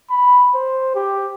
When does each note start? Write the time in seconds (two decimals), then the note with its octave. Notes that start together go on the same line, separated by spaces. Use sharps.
0.11 B5
0.55 C5
0.95 G4